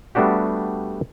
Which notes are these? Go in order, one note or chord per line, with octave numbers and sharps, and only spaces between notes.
G3 A3 B3 D4 F#4 G4